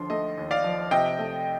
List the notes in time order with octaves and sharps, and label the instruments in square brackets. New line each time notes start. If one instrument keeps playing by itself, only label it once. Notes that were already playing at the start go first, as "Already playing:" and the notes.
Already playing: [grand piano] D#2 D3 F3 C6
A3 D#5
D#2
D5 F5
F3
C3 D#5 G5
A3